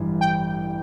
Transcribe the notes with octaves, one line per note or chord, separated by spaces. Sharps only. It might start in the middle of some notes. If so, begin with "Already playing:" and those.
Already playing: A1 G2 E3
G5